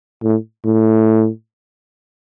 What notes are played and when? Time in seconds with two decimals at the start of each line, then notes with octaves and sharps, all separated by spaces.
0.23 A2
0.65 A2